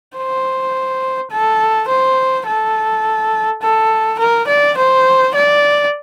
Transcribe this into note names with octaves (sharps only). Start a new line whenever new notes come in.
C5
A4
C5
A4
A4
A#4
D5
C5
D5